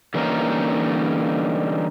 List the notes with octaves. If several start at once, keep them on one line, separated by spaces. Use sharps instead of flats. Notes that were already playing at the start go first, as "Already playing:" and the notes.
D3 E3 G3 A#3 C#4 D#4